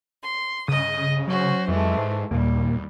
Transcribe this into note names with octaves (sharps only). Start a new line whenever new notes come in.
C6
G2 C#3 D#5 D#6
F#3 C#4 F#4 C5
F2 E3 G#3 A3
G#2 C5
D#2 A#2 G3 A#3